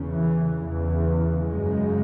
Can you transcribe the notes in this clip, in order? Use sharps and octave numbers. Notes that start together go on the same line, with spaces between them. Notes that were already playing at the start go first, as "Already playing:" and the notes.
Already playing: E2 C#3
E3
E2 C#3 E3
F#2 C#3 G#3